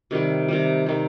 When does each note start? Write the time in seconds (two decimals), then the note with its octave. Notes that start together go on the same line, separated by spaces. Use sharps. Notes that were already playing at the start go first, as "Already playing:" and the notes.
0.11 C3 D#3 G3
0.48 C3 D#3 G3
0.86 C3 D#3 G3